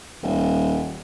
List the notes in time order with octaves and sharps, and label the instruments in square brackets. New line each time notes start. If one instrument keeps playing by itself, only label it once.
[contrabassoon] D#1